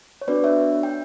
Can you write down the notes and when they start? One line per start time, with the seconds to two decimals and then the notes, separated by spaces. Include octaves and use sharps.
0.21 C#5
0.28 B3 D4 F#4 B4 D5
0.44 C#5 E5
0.83 G5